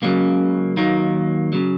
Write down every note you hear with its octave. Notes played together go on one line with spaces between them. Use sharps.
C#2 C#3 F#3 A#3
D#2 D#3 F#3 A#3
C#3 F#3